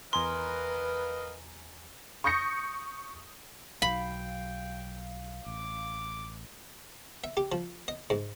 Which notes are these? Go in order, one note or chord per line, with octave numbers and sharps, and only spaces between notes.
E2 A#4 B4 D#5 F5 G#5 A#5 C6
C#6 D#6 G6 A#6 C#7
B1 F#3 F5 G5 B5
A1 D6
E5
G4
F3
D#5
G#2